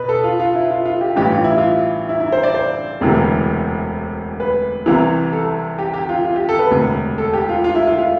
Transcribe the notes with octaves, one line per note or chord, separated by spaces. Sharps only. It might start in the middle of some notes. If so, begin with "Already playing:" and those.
Already playing: B2 B4
A4
F4
F4
E4
F4
F4
G4
A1 G2 E3 G4
F4
E4
F4
E4
E4
C5
D5
C5
E1 D2 C3 E3
B4
C2 C3 E3
A4
G4
G4
F4
F4
G4
A4
B4
E1 D2 C3
A4
G4
F4
F4
E4
F4
F4